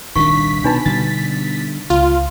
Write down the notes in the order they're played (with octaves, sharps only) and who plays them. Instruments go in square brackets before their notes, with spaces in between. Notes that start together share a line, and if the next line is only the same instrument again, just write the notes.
[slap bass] D#1 C2 D4 [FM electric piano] D#3 [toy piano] C#6 [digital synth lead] B6
[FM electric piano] B2 B4 A5 [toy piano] D4 D#4 B5
[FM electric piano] B2 A6 [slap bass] D3 G3 B3
[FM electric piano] C#2 [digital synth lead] F4